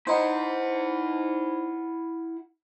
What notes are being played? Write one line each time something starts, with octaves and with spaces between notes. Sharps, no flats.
D#4 E4 C5 F#5